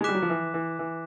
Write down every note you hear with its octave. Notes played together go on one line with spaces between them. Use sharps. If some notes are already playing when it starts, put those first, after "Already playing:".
G#3
G3 D6 F#6 B6 E7
F#3
F3
E3
E3
E3